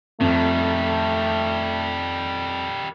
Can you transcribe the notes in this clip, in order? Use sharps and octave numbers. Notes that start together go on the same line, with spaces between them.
F2 D#3 G3 A3